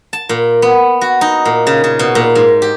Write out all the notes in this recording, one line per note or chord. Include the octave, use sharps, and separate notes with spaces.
A5
A#2
B3
F#4
D#4
A#2
C#3
C#3
B2
A#2
G#2
G4